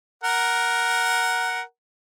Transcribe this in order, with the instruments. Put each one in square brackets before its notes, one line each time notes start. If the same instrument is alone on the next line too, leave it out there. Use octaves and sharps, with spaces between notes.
[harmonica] A#4 F#5